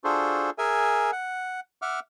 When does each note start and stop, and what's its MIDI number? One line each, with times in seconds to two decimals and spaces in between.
0.04 0.50 62
0.04 0.50 65
0.04 0.50 66
0.04 0.50 68
0.04 0.50 69
0.04 0.50 72
0.58 1.11 68
0.58 1.11 70
0.58 1.11 76
0.58 1.11 80
1.12 1.60 78
1.82 2.00 76
1.82 2.00 78
1.82 2.00 86
1.82 2.00 89